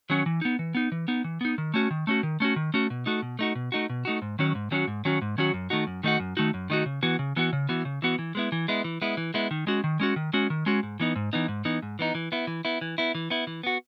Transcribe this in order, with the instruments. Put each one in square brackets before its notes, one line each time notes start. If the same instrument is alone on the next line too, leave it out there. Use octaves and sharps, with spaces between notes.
[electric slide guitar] D#3 F#3 C#4 F#4
E3
B3 D#4
E3
B3 D#4
E3
B3 D#4
E3
B3 D#4
D#3
A3 C#4 F#4
D#3
A3 C#4 F#4
D#3
A3 C#4 F#4
D#3
A3 C#4 F#4
B2
A3 D#4 F#4
B2
A3 D#4 F#4
B2
A3 D#4 F#4
B2
A3 D#4 F#4
G#2
D#3 F#3 C#4 F#4
G#2
D#3 F#3 C#4 F#4
G#2
D#3 F#3 C#4 F#4
G#2
D#3 F#3 C#4 F#4
F#2
D#3 A3 D#4 F#4
F#2
D#3 A3 D#4 F#4
F#2
D#3 A3 D#4 F#4
F#2
D#3 A3 D#4 F#4
C#3
E3 B3 F#4
C#3
E3 B3 F#4
C#3
E3 B3 F#4
C#3
E3 B3 F#4
E3
G#3 B3 E4
E3
G#3 B3 E4
E3
G#3 B3 E4
E3
G#3 B3 E4
D#3
G#3 C#4 F#4
D#3
G#3 C#4 F#4
D#3
G#3 C#4 F#4
D#3
G#3 C#4 F#4
G#2
E3 B3 D#4
G#2
E3 B3 D#4
G#2
E3 B3 D#4
G#2
E3 B3 D#4
E3
B3 E4
E3
B3 E4
E3
B3 E4
E3
B3 E4
E3
B3 F#4